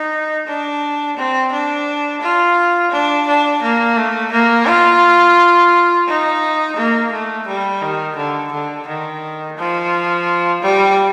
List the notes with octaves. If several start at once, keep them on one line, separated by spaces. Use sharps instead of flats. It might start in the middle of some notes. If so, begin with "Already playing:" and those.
Already playing: D#4
D4
C4
D4
F4
D4
D4
A#3
A3
A#3
F4
D#4
A#3
A3
G3
D#3
D3
D3
D#3
F3
G3